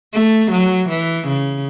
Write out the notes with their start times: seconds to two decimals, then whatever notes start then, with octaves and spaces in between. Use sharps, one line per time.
0.14 A3
0.52 F#3
0.90 E3
1.28 C#3